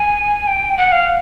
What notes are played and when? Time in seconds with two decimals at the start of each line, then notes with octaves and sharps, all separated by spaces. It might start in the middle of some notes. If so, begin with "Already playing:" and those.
Already playing: G#5
0.47 G5
0.77 F#5
0.92 F5